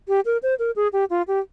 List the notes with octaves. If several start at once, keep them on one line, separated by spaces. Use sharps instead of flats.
G4
A#4
C5
A#4
G#4
G4
F4
G4